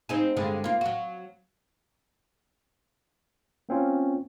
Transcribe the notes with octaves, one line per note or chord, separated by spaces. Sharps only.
C4 D#4 G#4
G2 D3 G#3
A#3 F4
F#3 F#4
A#3 C4 C#4 F4